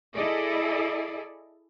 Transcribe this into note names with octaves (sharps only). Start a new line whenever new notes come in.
E4 G#4 A4 D5 D#5